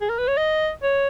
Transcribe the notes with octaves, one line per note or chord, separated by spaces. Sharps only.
G#4
A#4
B4
C#5
D#5
C#5